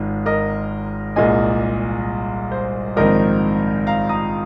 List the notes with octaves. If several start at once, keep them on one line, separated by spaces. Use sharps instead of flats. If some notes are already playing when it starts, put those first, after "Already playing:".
Already playing: G#1 G#2 G#3 F4
A#4 D#5
C2 A#2 G#3 D#4 D#5 G#5
C5
A#1 G#2 D#3 C4 A#4 D#5
F5 A#5
A#5 D#6